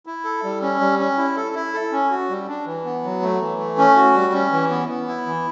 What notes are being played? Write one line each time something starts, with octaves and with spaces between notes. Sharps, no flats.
E4
A4
G3
C#4
G3
C#4
E4
A4
E4
A4
C#4
F#4
G3
D4
E3
B3
F#3
A3
E3
A3
C#4
F#4
G3
C#4
E3
B3
B3
E4
E3